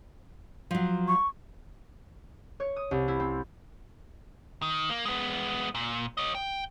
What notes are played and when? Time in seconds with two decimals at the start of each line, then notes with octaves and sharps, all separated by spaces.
0.71 F3 F#3
1.08 C#6
2.60 C#5
2.76 D#6
2.91 C2
3.08 E4
3.20 C4
4.62 D#3
4.89 A#3
5.05 G#3 B3
5.75 A#2
6.17 C#5 D#5
6.35 G5